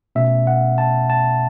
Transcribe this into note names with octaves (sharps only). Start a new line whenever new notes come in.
B2 A3 C#4 E5
F#5
A5
A5